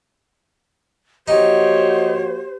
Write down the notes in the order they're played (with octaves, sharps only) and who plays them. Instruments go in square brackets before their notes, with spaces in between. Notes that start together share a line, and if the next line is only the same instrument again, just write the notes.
[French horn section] F3 A#3 F#4 [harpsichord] D#4 [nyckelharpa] G4 C#5 [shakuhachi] C5